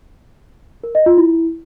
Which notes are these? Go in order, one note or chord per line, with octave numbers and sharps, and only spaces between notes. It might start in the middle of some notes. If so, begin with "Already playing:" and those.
A#4
D#5
F4
E4